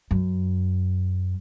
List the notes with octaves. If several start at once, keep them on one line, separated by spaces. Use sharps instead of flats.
F#2